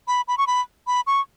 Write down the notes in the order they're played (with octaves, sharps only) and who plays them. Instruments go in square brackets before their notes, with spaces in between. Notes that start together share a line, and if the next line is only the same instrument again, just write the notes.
[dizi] B5
B5
C#6
B5
B5
C#6